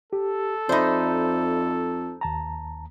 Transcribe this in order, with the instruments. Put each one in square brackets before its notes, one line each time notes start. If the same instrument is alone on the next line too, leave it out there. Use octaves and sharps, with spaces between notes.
[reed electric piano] G4 [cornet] A4
[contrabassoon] F2 [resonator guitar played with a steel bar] D#4 C5 [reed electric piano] D5 E5 B5
[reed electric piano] D#2 A5 A#5